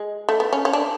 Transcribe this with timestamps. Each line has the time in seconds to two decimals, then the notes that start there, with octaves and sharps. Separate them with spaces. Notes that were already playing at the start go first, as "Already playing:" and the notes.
Already playing: G#3
0.29 A3
0.40 B3
0.53 C#4
0.65 C#4
0.73 D4